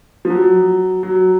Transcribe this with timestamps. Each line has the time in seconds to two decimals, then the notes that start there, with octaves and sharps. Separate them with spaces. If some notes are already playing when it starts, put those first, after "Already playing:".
0.25 F3
0.30 F#3
1.03 F#3